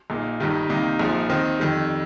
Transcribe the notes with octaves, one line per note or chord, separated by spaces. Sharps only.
A#1 A#2 A#3 D#4
G1 G2 D#3 G3 D#4
C2 C3 D#3 A#3 D#4
A#1 A#2 F3 A#3 D#4
D#2 D#3 C4 D#4
F2 D#3 G3